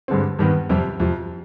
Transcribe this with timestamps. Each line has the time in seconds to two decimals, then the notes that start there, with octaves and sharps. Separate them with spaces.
0.08 G2 D3 G#3 C4
0.39 G2 D#3 B3
0.69 F2 C3 G3 C4 G4
1.00 F2 C3 F3